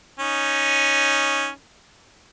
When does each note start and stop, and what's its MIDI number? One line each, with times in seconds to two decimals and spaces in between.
0.19 1.49 61
0.19 1.49 63